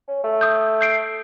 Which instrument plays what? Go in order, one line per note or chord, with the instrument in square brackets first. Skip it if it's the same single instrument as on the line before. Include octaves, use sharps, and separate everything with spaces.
[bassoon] C#4
A3
[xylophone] D#6 G6
G6 C7 D7